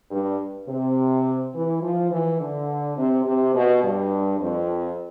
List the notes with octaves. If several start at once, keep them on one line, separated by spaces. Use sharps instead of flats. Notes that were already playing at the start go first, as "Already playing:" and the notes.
G2
C3
E3
F3
E3
D3
C3
C3
B2
G2
F2